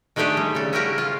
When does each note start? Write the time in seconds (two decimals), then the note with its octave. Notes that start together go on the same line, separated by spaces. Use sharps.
0.16 D#3 G#3 A3 D4 G4 G#4
0.37 G3
0.55 C#3 A4
0.73 C#4 E4 F#4 G4 A#4
0.98 F4